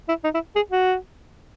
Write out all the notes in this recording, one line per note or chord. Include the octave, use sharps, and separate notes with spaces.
E4
D#4
E4
G#4
F#4